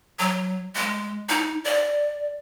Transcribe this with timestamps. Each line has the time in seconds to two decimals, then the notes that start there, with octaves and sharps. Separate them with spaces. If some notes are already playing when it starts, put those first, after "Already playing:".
0.19 F#3
0.75 G#3
1.29 D#4
1.64 D5